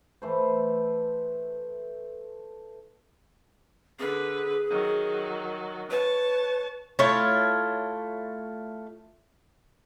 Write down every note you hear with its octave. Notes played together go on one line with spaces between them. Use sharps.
E3 A3 C5
D3 G#4 B4
D#3 F#3
B4 C#5 A5
A3 E4 F4 C#5